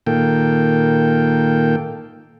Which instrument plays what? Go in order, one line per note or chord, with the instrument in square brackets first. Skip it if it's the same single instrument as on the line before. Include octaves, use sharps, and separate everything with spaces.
[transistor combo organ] A#2 D#3 A#3 A4 G5